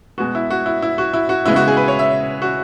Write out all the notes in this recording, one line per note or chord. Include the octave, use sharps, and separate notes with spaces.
B2 G#3 B3 F#4
E4
F#4
E4
E4
F#4
E4
F#4
C#3 G#3 B3 E4
F#4
G#4
B4
C#5
E5
F#4